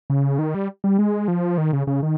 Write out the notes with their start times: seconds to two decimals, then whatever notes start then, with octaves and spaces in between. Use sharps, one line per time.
0.10 C#3
0.39 D#3
0.55 G3
0.84 G3
0.99 G#3
1.28 F3
1.58 D#3
1.73 C#3
1.87 C#3
2.03 D#3